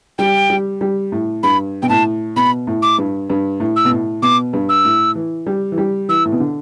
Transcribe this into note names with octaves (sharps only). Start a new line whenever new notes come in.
G3 G5
G3
G3
A2
G2 B5
B2 G5
A2 A5
B2 B5
A2
D6
G2
G2
A2
E6
B2
A2
B2 D6
G2
E6
A2
E3
G3
E3
G3
E3 E6
A2
B2
D3